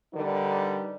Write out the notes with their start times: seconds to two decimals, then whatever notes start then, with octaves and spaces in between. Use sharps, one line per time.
0.14 D3 G3 D#4 A#4 B4